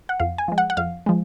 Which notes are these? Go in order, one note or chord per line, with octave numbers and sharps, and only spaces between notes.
F#5
F2 F5
G#5
F3 G#3
F#5
F#5
F2 F5
F3 G#3